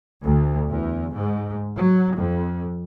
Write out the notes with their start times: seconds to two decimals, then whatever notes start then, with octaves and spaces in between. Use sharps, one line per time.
0.24 D2
0.68 E2
1.15 G#2
1.76 F#3
2.16 F2